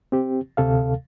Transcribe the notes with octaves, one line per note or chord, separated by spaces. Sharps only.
C4 G4
D2 C3 A4 F5